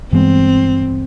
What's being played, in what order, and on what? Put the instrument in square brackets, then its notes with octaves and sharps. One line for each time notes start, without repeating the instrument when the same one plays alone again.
[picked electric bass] G2 E3 G#3 B3 [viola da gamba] C4